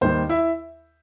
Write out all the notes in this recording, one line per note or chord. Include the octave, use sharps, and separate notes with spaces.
D#2 D#3 G3 D#4 C5
E4 E5